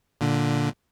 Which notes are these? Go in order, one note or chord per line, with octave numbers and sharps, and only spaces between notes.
A#2 D3